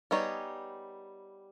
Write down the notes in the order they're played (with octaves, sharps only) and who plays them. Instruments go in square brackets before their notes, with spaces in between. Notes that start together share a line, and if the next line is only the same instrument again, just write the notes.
[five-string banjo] G3 B3 D#4 G#4 C#5